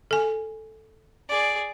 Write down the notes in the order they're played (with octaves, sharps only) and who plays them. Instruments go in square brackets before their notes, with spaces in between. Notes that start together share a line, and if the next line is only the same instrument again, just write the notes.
[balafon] A4 G#5
[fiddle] G#4 D5